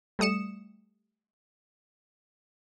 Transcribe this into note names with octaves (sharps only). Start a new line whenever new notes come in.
G3 A3 D#6 C#7 E7